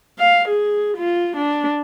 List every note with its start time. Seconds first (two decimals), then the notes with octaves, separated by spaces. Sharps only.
0.19 F5
0.48 G#4
0.97 F4
1.37 D4